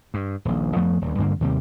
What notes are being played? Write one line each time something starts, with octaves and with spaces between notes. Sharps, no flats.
G2
D#1 A#1
F2 F3 A3 B3
D#1 D2
D2 G2 D3 A#3
D#2 C3 G3